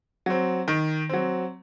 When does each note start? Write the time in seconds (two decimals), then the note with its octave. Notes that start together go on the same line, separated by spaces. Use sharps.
0.26 F#3 C4
0.68 D#3
1.09 F#3 C4